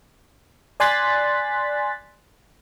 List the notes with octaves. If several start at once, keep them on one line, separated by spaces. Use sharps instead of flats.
D5 G#5 C6 F#6 A6 B6